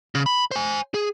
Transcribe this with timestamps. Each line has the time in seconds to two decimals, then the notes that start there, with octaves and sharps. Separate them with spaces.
0.15 C#3
0.26 B5
0.51 C5 G#5
0.94 G#4